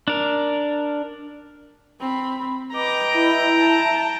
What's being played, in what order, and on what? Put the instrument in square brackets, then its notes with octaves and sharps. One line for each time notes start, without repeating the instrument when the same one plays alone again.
[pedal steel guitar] D4 A#4
[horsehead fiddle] C4 B5
[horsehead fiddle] B4 D#5 [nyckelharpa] G5 A#5 [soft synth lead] D6
[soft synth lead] E4
[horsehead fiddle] A5